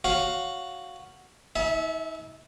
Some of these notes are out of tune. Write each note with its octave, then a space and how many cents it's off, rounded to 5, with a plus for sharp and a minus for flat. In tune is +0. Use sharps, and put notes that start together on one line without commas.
F#4 +0 C#5 +0 F5 +0
D#4 +40 E5 -15 G#5 +45